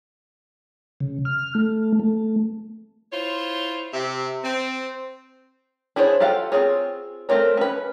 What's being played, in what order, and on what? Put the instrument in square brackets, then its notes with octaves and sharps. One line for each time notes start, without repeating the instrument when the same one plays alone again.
[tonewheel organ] C#3
F6
A3
A3
[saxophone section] E4 F4 C5 C#5
C3 E5
C4
[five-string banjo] D4 E4 G#4 C5 C#5
F4 G4 A4 F5 F#5
C4 C#4 F4 G#4 C#5
A3 C4 A#4 C#5
C#4 B4